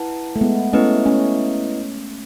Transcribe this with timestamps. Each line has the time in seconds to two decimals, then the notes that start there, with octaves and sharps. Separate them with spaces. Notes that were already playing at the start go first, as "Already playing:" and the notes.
Already playing: E4 B4 F#5 A5
0.36 A3
0.41 G#3 B3
0.73 A3 B3 C#4 E4 B4 D#5
1.06 A3 C#4